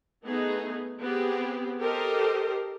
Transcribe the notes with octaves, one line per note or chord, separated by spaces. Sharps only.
A3 B3 D#4 G#4
B3 C4 G4 G#4
G4 A4 A#4 C5 D#5